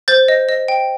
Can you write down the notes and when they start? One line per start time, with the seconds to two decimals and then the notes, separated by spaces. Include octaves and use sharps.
0.08 C5 G6 A6
0.28 D#5
0.49 D#5
0.68 G5